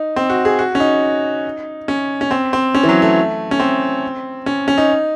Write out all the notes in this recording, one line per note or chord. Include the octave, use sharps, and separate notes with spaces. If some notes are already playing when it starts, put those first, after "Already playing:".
Already playing: D#4
C4
F#4
G#4
F#4
C#4
D#4
C#4
C#4
C4
C4
C#4
E3
F#3
A3
C#4
C4
C#4
C#4
D#4